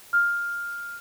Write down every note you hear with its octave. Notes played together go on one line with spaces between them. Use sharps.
F6